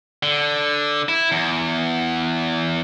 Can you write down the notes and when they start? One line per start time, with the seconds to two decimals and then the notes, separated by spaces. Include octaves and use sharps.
0.23 D3
1.09 E4
1.32 E2